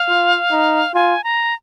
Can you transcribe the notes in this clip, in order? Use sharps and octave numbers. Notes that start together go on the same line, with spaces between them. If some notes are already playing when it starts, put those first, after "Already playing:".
Already playing: F5
F4
D#4
F4 G#5
A#5